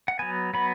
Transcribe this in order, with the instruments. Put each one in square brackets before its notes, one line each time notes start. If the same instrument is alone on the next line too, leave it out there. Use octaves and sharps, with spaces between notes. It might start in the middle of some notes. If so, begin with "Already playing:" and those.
[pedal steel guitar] F#5
F#3 B3 G#5
F#3 B3 B5